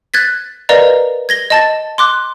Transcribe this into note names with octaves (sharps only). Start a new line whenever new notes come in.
F#6 G#6 A6 B6
A#4 B4 D5 D#5 F5 A#5
G#6 A#6 G7
D#5 A5 A6
C6 D6 F#6